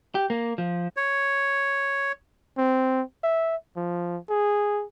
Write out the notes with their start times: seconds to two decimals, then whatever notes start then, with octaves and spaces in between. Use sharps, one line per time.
0.15 G4
0.30 A#3
0.58 F3
0.97 C#5
2.58 C4
3.23 E5
3.77 F3
4.30 G#4